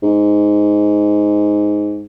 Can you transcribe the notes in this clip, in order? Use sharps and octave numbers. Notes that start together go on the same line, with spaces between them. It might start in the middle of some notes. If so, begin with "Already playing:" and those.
G#2